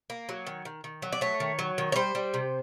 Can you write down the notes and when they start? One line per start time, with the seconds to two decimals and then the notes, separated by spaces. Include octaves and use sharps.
0.10 A#3
0.29 F#3
0.47 D#3
0.65 D#3
0.84 D#3
1.02 F#3
1.12 D5
1.21 A3 C#5
1.40 D#3
1.59 F#3
1.78 D#3
1.92 C#5
1.96 G3 C5
2.15 G3
2.34 C3